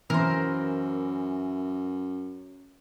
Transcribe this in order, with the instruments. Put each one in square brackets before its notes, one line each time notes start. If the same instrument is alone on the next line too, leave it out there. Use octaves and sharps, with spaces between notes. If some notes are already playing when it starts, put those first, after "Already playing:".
[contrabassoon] F#2 [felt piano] E3 [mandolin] A#4 C5